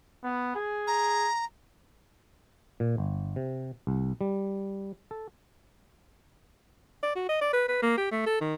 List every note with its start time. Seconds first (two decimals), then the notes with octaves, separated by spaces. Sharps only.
0.23 B3
0.55 G#4
0.87 A#5
2.80 A#2
2.98 G1
3.36 C3
3.87 C2
4.21 G3
5.11 A4
7.03 D5
7.16 F#4
7.29 D#5
7.41 D5
7.53 B4
7.69 B4
7.83 A#3
7.97 G4
8.12 A3
8.26 A4
8.41 D#3